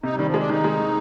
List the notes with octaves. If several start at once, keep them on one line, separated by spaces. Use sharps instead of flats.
C3 D#4
D#3 G3
F3
G#3 D4
D#3 D#4
G#3
D#3